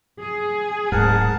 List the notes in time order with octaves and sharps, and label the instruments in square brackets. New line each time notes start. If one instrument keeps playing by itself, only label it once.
[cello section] G#4
[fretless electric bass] D1 G#2 [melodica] A#4 F#5 A5